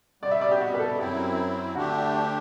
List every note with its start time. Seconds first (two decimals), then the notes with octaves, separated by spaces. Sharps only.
0.22 B2 G3 B3 D5
0.31 E5
0.41 D5
0.51 G4
0.60 F#4
0.74 B4
0.79 A4
0.98 F#2 F#3 C4 E4 G4
1.75 D2 D3 A3 D4 F#4 G4